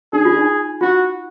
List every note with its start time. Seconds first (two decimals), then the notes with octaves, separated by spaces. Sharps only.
0.13 D#4 G#4
0.25 F4
0.37 D#4
0.81 F4 F#4